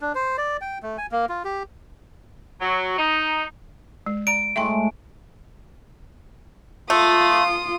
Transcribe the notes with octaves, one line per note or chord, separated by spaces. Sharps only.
D4
C5
D5
G5
A3
G#5
A#3
F4
G4
F#3
D#4
G#3
D5 A#5 D7
A2 G#3 A3 E5 G5 C6
A3 F4 C6 D#6